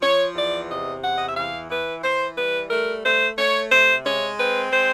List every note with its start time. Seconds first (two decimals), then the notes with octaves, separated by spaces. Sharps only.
0.01 F3 C#5
0.35 E2 D5
0.70 C3 D#5
1.02 E2 F#5
1.18 D#5
1.27 E5
1.36 E3 F5
1.69 E3 B4
2.03 E3 C5
2.37 G3 B4
2.70 A3 A#4
3.04 A3 C5
3.37 A3 C#5
3.71 C3 C5
4.05 G#3 C#5
4.38 C4 B4
4.72 G#3 C5